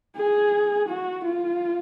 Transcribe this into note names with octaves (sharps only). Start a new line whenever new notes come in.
G#4
F#4
F4